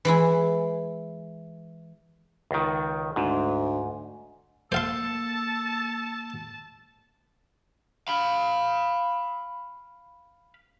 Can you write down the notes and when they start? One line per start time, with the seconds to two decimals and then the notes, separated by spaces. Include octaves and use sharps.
0.05 E3 G#3 E4
2.51 C#2 D#3
3.16 D2 G#2
4.72 A#3 A4 C5 F5 A5 C6
8.08 F5 B5